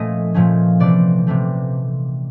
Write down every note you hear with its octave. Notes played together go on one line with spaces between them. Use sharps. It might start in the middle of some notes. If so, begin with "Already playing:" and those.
Already playing: A#2 F3 A3 C#4 D#5
A#2 F3 A3 C#4
C3 E3 A3 C4 D5
C3 E3 A3 C4